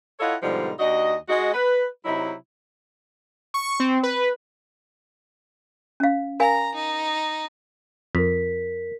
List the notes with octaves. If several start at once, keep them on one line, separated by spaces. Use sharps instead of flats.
E4 F4 A4 C#5 D#5 F#5
G#2 B2 D3 F3 G3 D#4
D#2 D4 F#4 D#5
G#3 F#4 D#5
B4
C3 F#3 D#4 E4
C#6
C4
B4
C#4 F5
A#4 F5 G#5 A#5
D#4
F2 A#4 B6